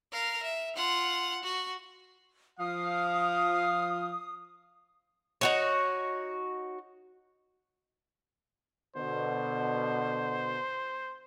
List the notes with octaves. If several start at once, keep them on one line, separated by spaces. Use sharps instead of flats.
A#4 F5
E5
F4 F#5
F#4
F3 F5 D#6
D#4 F#4 C#5
B2 D3 C5